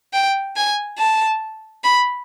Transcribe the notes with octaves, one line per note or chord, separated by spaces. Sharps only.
G5
G#5
A5
B5